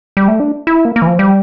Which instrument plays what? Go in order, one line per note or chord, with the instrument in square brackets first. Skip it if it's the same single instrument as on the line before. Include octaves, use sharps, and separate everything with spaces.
[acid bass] G3
A3
D4
E4
A#3
A#3
E3
F3
G3